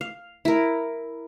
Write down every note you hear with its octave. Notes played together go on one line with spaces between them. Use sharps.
F5
E4 A#4